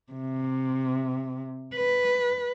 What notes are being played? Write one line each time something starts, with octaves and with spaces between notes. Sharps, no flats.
C3
B4